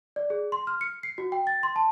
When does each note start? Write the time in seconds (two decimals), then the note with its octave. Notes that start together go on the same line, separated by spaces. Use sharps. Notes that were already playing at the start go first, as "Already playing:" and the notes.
0.16 D5
0.30 G#4
0.52 C6
0.67 F6
0.81 C#7
1.03 C7
1.18 F#4
1.32 G5
1.47 A6
1.63 C6
1.76 A5